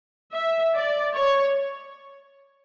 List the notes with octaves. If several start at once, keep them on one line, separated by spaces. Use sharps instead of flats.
E5
D5
C#5